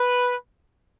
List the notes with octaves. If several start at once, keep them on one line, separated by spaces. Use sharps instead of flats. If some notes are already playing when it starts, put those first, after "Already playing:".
Already playing: B4